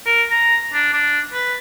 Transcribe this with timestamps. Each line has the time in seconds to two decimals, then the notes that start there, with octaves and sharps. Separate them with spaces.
0.06 A#4
0.31 A#5
0.73 D4
0.93 D4
1.32 B4